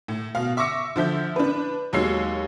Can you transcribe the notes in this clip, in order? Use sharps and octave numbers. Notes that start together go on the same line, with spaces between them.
A2
B2 F5
E5 C#6 D6 E6 A#6 C#7
D3 F3 E5 G6
D4 B4
D#2 F#3 G#3 C#5 E6 C7